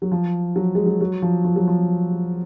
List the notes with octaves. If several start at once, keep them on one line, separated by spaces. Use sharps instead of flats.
F#3
F3
F#3
G#3
F#3
F#3
F3
F3
F#3
F3